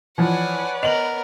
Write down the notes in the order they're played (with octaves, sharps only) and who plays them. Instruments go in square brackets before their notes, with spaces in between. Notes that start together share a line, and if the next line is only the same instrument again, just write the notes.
[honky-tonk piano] E3 F3 [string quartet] B4 C#5 D5 [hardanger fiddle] F#5 G#5
[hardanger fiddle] B3 A#4 [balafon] D#5 [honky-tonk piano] F7 F#7